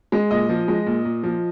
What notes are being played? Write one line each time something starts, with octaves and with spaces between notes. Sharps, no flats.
G#3
A#2 D#5
F3
G#3
A#2
A#2
F3